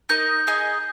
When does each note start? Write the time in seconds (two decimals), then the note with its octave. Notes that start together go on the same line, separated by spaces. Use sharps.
0.09 D#4 A#4 D#5 G6
0.47 D#4 G#4 D#5 G#5